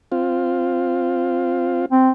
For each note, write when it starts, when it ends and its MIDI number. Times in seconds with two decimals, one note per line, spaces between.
0.12 1.86 60
0.12 1.86 65
1.92 2.10 60